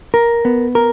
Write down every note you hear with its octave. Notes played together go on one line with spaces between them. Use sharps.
A#4
B3
A#4